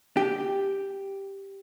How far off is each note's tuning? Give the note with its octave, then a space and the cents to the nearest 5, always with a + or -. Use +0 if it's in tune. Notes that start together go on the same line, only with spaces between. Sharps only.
G4 +0